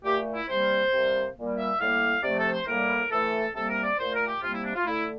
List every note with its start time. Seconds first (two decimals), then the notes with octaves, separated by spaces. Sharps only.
0.04 A#2 A3 G4
0.34 E4
0.48 C3 G3 A#3 C5
0.92 C3 G3 A#3
1.36 A#2 G3 A#3
1.57 E5
1.79 A2 G3 A#3 F5
2.23 C3 F3 A3 D5
2.38 A4
2.52 C5
2.67 A2 G3 A#3 A#4
3.10 A2 E3 A3 A4
3.54 C3 G3 A#3 A4
3.69 A#4
3.84 D5
3.98 A#2 A3 C5
4.13 A#4
4.27 G4
4.42 C3 G3 A#3 F4
4.53 E4
4.64 D4
4.74 F4
4.85 D3 A3 E4